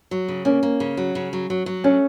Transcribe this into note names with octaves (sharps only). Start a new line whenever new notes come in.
F#3
C#3
A#3 C#4
A#3
C#3
F#3
C#3
F#3
F#3
F#3
A3 C#4